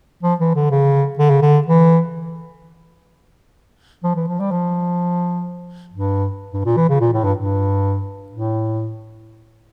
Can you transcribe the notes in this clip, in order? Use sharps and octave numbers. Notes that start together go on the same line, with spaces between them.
F3
E3
D3
C#3
D3
C#3
D3
E3
F3
E3
F3
G3
F3
G2
G2
A#2
E3
C#3
A#2
A2
G2
G2
A2